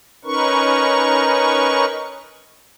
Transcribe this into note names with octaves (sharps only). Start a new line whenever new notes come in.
C#4 D#4 A#4 B4 C#6